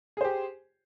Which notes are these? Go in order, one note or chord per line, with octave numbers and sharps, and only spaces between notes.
G4 G#4 C5